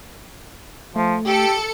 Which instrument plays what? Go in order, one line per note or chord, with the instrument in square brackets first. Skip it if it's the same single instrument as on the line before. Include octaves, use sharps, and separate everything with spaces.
[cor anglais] F3 [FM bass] A3
[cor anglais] G4 [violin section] A4 C#7